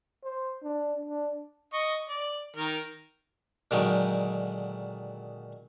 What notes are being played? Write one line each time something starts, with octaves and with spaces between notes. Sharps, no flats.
C5
D4
D4
D#5 C#6
D5
D#3 A#4
A#2 D3 D#3 F#3 G#3 D#4